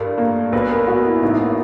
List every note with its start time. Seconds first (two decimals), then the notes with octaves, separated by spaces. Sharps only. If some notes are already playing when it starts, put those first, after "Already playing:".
Already playing: G2 A3 F4 A#4
0.18 A#3
0.52 B1 B4
0.70 A#4
0.87 B3 F#4
1.05 E4
1.22 A1 D#4
1.40 A#3